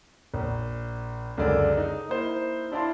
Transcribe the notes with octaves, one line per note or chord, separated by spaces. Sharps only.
A#1
C#2 F#2 D3 A#4 D5 E6
D#4
A#3 D#4 E4 C5
D4 E4 D5 F5 A5 C6